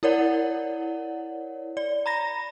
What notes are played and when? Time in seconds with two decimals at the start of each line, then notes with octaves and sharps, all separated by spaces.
0.03 E4 A#4 C#5 D5 F#5
1.77 D5
2.06 A#5 B5 A#6